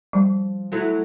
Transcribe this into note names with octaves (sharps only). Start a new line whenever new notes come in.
F3 G3
F#3 A3 E4